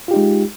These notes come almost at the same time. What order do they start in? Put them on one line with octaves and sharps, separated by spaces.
F4 G4 D#4 G#3